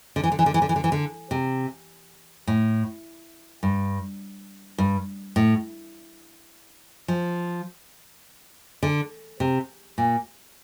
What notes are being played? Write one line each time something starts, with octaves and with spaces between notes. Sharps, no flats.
D3
E3
D3
E3
D3
E3
D3
E3
D3
E3
D3
C3
A2
G2
G2
A2
F3
D3
C3
A#2